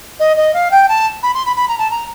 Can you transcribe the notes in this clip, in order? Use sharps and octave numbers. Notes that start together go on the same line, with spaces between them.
D#5
D#5
F5
G5
A5
B5
C6
B5
B5
A#5
A5
A#5